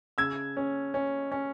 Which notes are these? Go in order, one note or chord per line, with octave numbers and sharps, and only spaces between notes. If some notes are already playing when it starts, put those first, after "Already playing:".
C#3 E6 G#6
C#4
C#4
C#4